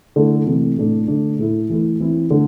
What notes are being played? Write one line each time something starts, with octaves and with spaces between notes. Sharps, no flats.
D3 A3 E4
C3 E3 A3
A2 A3 D4
D3 A3 D4
A2 A3 E4
E3 A3 E4
E3 C4 E4
D3 A3 D4